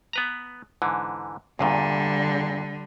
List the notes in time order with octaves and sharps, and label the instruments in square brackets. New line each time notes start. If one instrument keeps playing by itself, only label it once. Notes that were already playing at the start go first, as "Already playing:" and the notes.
[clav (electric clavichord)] B3 B4 A#5
G#2 D3 E3
[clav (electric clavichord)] E2 G2 A#2 [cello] D3 G3